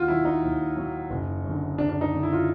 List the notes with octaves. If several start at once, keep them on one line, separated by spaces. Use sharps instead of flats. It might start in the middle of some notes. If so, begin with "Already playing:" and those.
Already playing: D#2 F4 F#4
D#3 F#3 E4
D#4
D#2
D#3 F#3
F#1
F#2
D3
F#1 D4
D4
D#4
F#2 D3
E4
F4